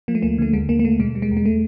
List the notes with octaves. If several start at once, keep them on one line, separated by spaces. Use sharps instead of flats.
F3 A#3
A3
D2 A#3
D3 A3
D#2 G#3
D#2 A#3
A#3
D#2 A3
B2 G#3
G3
G#3
E2
G#3
A3